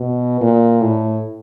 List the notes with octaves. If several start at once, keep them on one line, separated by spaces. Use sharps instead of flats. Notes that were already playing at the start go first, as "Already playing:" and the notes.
Already playing: B2
A#2
A2